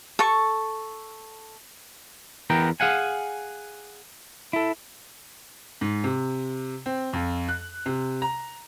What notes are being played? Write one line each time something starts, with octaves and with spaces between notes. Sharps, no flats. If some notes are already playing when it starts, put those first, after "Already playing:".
A4 C#6
E2 E3 B3 A#4 G5 A#5
G#4 F5 F#5 G#5
E4 A4
G#2
C3
C4
F2
F#6
C3
A#5